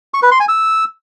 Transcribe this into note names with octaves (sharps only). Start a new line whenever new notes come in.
C#6
B4
C6
G#5
E6